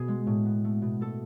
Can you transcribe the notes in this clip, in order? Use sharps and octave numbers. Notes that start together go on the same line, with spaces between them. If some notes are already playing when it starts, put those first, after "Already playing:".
Already playing: B2 B3 G#4
G#3
A2
B3
A3
B2
A3 A4